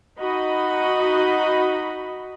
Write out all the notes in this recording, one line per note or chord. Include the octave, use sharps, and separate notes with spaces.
D#4 F#4 D#5 B5